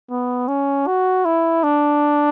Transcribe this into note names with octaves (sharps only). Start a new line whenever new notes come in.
B3
C#4
F#4
E4
D4